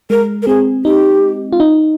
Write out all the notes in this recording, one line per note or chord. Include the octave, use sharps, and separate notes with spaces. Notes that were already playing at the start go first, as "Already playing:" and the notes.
G#3 A#4
A#4
C4 G#4
D#4 G4
F4
D#4